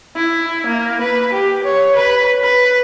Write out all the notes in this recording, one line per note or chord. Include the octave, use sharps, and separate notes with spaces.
E4
A#3
B4
G4
C#5
B4
B4